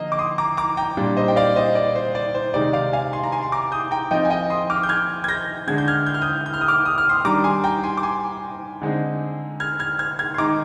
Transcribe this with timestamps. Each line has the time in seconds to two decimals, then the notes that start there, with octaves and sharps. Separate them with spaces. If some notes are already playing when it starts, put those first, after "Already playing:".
Already playing: D3 F3 A#3 D#5
0.12 D6
0.19 C6 D#6
0.38 A#5 D6
0.57 A#5 D6
0.77 G5 A#5
0.97 A#2 G3 D4
1.17 C5 D#5
1.28 G5
1.36 D5 F5
1.56 C5 D#5
1.75 D5
1.95 C5
2.15 D5
2.34 C5
2.54 C3 D#3 G#3 D#4 D5
2.73 D5 F5
2.93 F5 G#5
3.13 G#5 C6
3.24 A#5
3.32 G#5 C6
3.43 C6
3.52 A#5 D6
3.72 D#6 G6
3.91 G5 A#5
4.11 F3 C4 D#4 D#5 G5
4.25 G#5
4.30 D#5 G5
4.50 C6 D#6
4.70 D6 F6
4.83 G6
4.89 F6 G#6
5.24 G#6
5.28 G6 A#6
5.67 D3 G#3 D4 G#6
5.78 G6
5.88 F6 G#6
6.06 G6
6.14 F6
6.21 D#6 G6
6.46 G6
6.54 F6
6.61 D#6
6.68 D6 F6
6.86 D#6
6.98 F6
7.09 C6 D#6
7.25 D#3 G3 D4 A#5 D6
7.44 G#5 C6
7.64 G5 A#5
7.83 G#5 C6
7.97 D6
8.03 G#5 C6
8.82 D3 G#3 C4 D#4
9.60 F6 G#6
9.79 F6 G#6
9.99 F6 G#6
10.19 F6 G#6
10.34 C6
10.38 D#3 G#3 D#4 A#5 D6